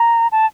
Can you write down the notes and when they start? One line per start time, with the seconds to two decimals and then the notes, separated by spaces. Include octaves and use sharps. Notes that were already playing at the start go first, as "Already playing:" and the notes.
Already playing: A#5
0.32 A5